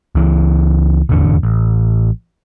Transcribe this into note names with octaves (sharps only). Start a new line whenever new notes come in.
C#2 E3
D#1 G#1 E2 D3
A1